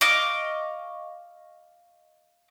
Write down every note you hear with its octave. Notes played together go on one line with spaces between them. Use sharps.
D#5 F5 C#6 D6